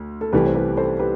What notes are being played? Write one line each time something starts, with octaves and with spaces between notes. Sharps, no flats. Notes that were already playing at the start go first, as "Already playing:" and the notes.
Already playing: D2
A4
C2 C3 E3 A3 G4 B4
C5
G4 B4
A4 C5
G4 B4